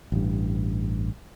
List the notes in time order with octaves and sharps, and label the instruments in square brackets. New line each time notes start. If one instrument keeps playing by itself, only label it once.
[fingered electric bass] A1 G2